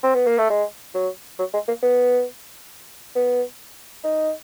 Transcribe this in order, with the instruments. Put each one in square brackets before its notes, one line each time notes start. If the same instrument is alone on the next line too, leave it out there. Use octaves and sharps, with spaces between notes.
[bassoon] C4
B3
A#3
A3
G#3
F#3
F#3
G#3
A#3
B3
B3
D#4